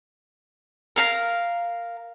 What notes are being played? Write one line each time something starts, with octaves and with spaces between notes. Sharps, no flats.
A#4 F5 A#5